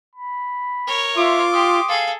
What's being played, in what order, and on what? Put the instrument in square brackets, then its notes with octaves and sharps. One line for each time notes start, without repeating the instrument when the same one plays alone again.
[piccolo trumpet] B5
[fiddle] A#4 C#5
[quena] F4 [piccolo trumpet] E5 [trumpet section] C6 D6
[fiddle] G4 [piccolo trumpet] D#6
[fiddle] G#4 A4 [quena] F5